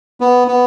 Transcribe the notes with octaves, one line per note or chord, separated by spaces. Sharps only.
B3
B3